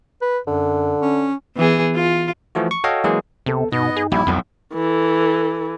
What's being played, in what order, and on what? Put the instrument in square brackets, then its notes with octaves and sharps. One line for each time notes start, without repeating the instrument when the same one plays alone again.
[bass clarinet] B4
[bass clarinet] F#2 [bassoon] D3
[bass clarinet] C#4
[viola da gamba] E3 B3 G#4
F4
[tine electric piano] E3 F3 A3 F#4
C#6
F#4 A4 C#5 D#5 F5 G5
E3 F#3 G#3 A#3 G#4
[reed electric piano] C#2 B3 A4 [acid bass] C3
[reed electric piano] G2 D#4 [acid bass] B2 [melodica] B3 D#5
[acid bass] G#4
[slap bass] A#1 [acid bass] G3 [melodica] E4
[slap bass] B1 A2 [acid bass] F2
[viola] E3 A4